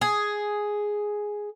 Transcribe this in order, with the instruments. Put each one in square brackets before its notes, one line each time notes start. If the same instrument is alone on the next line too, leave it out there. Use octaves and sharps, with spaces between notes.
[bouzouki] G#4